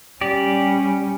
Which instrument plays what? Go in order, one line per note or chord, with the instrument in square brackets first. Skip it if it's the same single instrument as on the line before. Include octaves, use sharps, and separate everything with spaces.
[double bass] G3 C#4 [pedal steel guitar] G4 D5